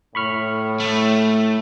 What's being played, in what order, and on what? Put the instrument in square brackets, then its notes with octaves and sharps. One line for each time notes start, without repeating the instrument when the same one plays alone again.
[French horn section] A2 [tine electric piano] B5 C#6 F6
[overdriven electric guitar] A3